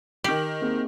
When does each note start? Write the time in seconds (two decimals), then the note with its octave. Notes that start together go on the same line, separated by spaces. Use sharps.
0.24 D#3 G4 F#7
0.62 A#3 C4 G#4